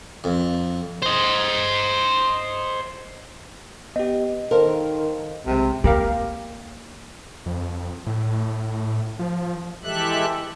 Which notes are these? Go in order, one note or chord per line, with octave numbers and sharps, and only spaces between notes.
F2
C5 D#5
B3 G4 D#5
D#3 A4 A#4 C5 F5
B1 C3 G#3
A#3 G4 A#4 F5
F2
A2
F3
E3 G#3 G4 A4 E5 F#6